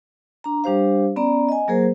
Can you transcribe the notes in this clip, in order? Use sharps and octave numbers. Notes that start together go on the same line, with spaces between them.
D4 A#5
G3 D4 G4 C5 F5
B3 C#4 D5 A#5
D#5 G#5
F#3 A#3 G#4 A#4 C5